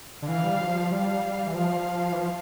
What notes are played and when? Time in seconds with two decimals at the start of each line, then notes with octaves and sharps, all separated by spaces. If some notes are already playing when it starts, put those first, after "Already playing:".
0.22 D3
0.29 E3 F5
0.44 G3
0.60 F3
0.92 G3 F5
1.47 E3
1.55 F3 F5
2.12 E3
2.18 F3